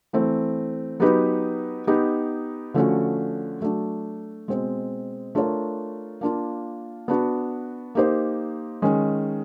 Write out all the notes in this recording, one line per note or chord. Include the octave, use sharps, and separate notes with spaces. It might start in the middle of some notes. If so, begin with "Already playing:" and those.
E3 A3 C4
F#3 B3 D#4 G4 B4
B3 D#4 G4
D3 F3 A3 C#4 F#4
F#3 A3 D4 F#4
B2 G#3 C4
A3 D4 F4 A#4 C#5
A#3 D4 F4
B3 D4 F#4
A#3 D#4 G4 C5
D#3 G#3 C#4